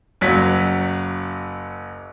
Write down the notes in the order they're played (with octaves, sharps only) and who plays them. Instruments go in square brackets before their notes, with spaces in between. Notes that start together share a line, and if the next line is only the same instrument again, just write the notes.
[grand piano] F#1 F#3 B6